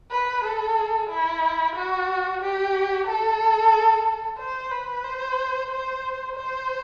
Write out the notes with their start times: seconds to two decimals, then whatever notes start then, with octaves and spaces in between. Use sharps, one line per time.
0.11 B4
0.44 A4
1.10 E4
1.75 F#4
2.42 G4
3.07 A4
4.39 C5
4.71 B4
5.04 C5
5.70 C5
6.35 C5